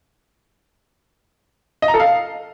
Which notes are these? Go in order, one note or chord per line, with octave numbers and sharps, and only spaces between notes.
D#5
A#5
A4
F5